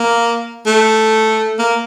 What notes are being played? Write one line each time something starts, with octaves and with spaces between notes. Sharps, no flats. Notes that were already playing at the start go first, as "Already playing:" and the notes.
Already playing: A#3
A3
A#3